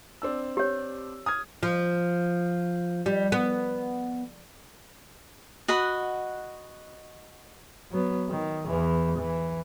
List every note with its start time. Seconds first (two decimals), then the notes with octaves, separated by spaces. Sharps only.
0.22 C4 D4 E6
0.57 G4 C#5
1.26 D#6 F6 G#6
1.63 F3
3.06 G3
3.32 B3
5.68 F#4 D#5 F#5 B5
7.91 F#3 B3
8.29 D#3
8.67 E2 E3
9.18 E3